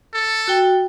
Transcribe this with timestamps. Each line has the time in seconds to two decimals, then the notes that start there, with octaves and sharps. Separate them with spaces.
0.14 A4
0.48 F#4 G5